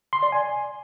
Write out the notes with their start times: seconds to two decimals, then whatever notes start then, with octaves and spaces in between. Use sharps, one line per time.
0.13 C6
0.23 D5
0.32 G#5